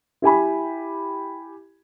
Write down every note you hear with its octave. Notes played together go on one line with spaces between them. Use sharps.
E4 G4 G#5 B5